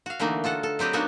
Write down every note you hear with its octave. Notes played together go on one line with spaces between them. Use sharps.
F#4 F5
D3 E3 A3 A#3 D#4
F4 F#4 A4 F#5
A4
F#3 C4 G4 B4 D#5
A#3 B3 D4 D#4 F#4